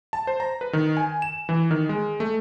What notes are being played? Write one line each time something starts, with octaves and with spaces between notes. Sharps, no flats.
A5
C5
A#5
B4
D#3
G#5
E7
E3
D#3
G#3
A3